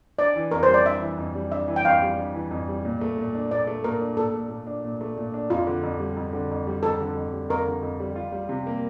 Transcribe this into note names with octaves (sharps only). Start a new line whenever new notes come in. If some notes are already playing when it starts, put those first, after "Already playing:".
D4 D5
E3
F2 A#4
C5
G3
D5
D4 E5
E3
F2
G3
D4 E5
E3
G5
F2 F5
G3
D4
E3
F2
G3
A#2
A3
A#2
D4
A#2 D5
A3
A#2 A#4
D4
A#2 A4
A3
A#2
D4
A#2
A3
A#2
D4
F2 F4
D3
F2
G3
F2
D3
F2
G3
F2 A4
D3
F2
G3
F2 A#4
D3
F2
G3
F4
G3
C3
A#3